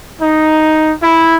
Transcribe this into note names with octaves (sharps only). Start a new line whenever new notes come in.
D#4
E4